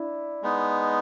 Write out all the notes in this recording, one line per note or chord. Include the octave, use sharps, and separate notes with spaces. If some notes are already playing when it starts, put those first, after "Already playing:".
Already playing: D4 E4
G#3 B3 D#4